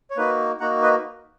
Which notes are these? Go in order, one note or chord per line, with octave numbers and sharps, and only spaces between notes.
C#5
A#3 D#4 F#4 B4
A#3 D#4 F#4 F#5 A#5
B4 D#5